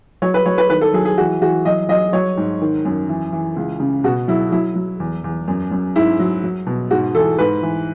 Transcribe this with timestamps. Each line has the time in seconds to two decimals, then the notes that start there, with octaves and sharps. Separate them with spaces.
0.22 F#3 C#5
0.34 B4
0.46 F#3 C#5
0.58 B4
0.70 D#3 B4
0.81 A4
0.94 F#3 G#4
1.05 G#4
1.18 E3 F#4
1.42 E3 F#4
1.65 F#3 D#5
1.89 F#3 D#5
2.13 F#3 C#5
2.37 G#2
2.62 D#3
2.85 F#2
3.09 E3
3.32 E3
3.56 C#2
3.80 C#3
4.04 B2 F#4
4.28 F#3 E4
4.52 F#3 E4
4.76 F#3
5.00 E2
5.24 E2
5.48 F#2
5.71 F#2
5.96 G#2 E4
6.20 F#3
6.44 F#3
6.67 B2
6.91 G#2 F#4
7.15 E3 A4
7.39 G#2 B4
7.62 E3